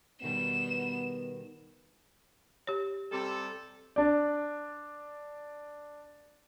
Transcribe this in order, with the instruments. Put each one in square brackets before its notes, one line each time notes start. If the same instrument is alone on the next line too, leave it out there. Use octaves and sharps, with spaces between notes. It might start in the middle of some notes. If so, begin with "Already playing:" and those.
[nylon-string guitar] B2 D#3 G3 [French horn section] B3 [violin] E7
[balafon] G4 C#5
[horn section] C3 G3 A4
[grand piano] D4 D5